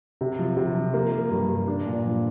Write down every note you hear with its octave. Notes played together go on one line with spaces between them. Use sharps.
C3
F3
C3
F3
A#3
A#3
G2
G2
D4
A#2
F3